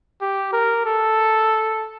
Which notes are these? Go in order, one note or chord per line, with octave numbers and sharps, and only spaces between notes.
G4
A#4
A4